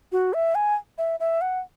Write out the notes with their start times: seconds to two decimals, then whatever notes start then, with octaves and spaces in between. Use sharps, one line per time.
0.12 F#4
0.34 E5
0.55 G#5
0.98 E5
1.20 E5
1.41 F#5